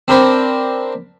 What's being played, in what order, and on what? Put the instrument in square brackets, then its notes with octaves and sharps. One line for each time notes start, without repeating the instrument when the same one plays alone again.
[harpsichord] C4 D4 A#4 C5 B5